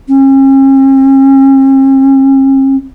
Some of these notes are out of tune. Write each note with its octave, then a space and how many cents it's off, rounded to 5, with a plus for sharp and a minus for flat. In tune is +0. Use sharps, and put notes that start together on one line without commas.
C#4 -45